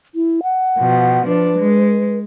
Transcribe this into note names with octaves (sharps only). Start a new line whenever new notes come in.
E4
F#5
B2 F3
F3 D4 B4
G#3